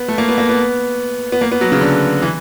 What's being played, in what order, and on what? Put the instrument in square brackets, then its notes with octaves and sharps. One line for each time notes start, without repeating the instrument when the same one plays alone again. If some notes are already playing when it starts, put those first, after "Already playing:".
Already playing: [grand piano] B3
A3
A#3
B3
A#3
B3
B3
A#3
B3
F#3
C#3
D3
E3